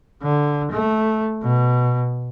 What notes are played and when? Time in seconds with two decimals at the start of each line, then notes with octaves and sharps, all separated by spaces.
0.23 D3
0.72 A3
1.43 B2